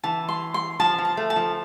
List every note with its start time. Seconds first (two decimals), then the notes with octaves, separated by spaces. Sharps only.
0.04 E3 A5
0.29 C6
0.54 C6
0.80 F3 A5
0.98 F3
1.05 A5
1.17 A3
1.30 A5
1.36 F3